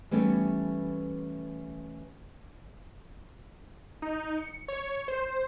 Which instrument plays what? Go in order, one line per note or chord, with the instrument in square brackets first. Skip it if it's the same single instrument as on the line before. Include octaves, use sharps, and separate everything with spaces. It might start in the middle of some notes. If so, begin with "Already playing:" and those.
[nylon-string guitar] E3 G3 A3 B3 C#4 A4
[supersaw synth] D#4
C#7
C#5
C5